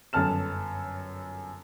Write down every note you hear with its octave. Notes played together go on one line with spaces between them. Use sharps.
G1 F#2 A4 A5 F6 E7